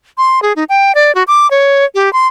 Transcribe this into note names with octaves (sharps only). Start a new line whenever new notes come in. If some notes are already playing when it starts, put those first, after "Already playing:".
C6
G#4
D#4
G5
D5
F#4
D6
C#5
G4
C6